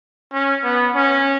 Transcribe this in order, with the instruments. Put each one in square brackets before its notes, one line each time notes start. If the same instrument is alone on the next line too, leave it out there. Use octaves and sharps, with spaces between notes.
[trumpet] C#4
B3
C#4